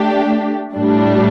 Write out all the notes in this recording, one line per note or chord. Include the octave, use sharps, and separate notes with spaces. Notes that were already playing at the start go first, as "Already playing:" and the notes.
Already playing: A3 D4 G4
A2 G3 D4